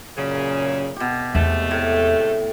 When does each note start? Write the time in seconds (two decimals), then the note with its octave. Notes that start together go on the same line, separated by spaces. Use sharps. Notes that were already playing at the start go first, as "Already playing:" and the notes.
0.17 F#2 A#2 C#3
0.96 B2 G4
1.35 E2 C3 G#3 A3 B3
1.71 A2